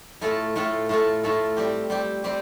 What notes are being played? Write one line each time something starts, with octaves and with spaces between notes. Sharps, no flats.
A2 A3 F4 A4
A2 A3 F4 A4
A2 A3 F4 A4
A2 A3 F4 A4
G3 C4 G4
G3 C4 G4
G3 C4 G4